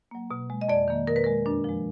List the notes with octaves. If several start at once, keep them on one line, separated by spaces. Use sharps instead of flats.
F#3 A#3
B2
G#3
D#5
F2 D5
D#3 A#3
B2 A#4
B4
G#3 A#4
F#2 D4
F3 G#3